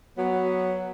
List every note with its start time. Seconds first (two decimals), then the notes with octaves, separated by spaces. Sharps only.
0.18 F#3 B3